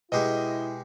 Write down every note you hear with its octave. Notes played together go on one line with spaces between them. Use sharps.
B2 G#3 E4 G4 D#5